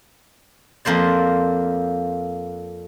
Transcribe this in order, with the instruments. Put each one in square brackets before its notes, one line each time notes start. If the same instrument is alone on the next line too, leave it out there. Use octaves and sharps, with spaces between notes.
[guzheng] F2 A#3 C5 D5